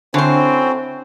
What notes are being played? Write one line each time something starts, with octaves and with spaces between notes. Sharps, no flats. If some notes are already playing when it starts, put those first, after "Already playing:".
D3 C4 C#4 E4 F#4 C5